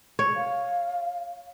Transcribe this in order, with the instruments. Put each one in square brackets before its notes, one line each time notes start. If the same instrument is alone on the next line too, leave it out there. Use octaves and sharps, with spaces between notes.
[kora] C#5
[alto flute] F5